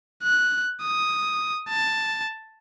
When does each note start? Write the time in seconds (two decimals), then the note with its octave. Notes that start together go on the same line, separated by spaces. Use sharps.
0.23 F#6
0.82 D#6
1.69 A5